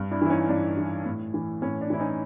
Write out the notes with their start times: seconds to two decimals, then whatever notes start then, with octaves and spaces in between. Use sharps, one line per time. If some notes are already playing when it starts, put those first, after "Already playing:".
Already playing: G2
0.11 D4 E4
0.22 E3 E4
0.30 C#4 D#4
0.49 G2 D4
0.78 E3
1.06 A2
1.34 E3
1.62 A2 C#4
1.81 D4
1.90 E3 E4
2.00 C#4 D#4